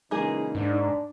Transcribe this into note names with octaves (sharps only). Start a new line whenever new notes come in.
A#2 C#3 E3 G#3 A#3 D#4 G#4
G#2 D4